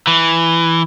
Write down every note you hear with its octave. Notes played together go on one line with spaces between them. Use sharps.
E3